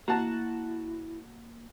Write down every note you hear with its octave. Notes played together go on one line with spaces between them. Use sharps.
A#3 E4 F#4 A5 A#5